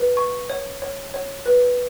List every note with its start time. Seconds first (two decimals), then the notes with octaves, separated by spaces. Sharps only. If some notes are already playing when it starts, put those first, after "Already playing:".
Already playing: B4
0.17 C#6
0.50 C#5
0.82 C#5
1.14 C#5
1.46 B4